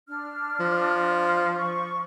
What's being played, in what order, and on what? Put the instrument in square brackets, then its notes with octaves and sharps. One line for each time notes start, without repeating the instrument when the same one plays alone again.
[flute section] D4 F6
[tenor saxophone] F3
[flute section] C#6